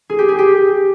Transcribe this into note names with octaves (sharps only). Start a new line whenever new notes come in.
G#4
G4
G#4
G4